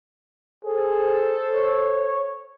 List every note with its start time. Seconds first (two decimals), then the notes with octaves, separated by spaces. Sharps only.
0.65 G#4 A4 C5
1.53 C#5